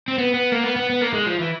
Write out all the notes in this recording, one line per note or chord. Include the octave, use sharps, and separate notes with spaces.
C4
B3
B3
A#3
B3
B3
B3
A#3
G#3
F3
E3